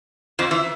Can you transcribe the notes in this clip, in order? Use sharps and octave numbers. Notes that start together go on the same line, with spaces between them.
F2 F3
E3